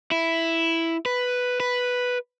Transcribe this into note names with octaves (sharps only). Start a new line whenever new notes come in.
E4
B4
B4